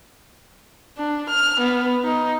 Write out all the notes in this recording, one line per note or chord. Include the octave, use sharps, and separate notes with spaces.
D4
F6
B3
D#4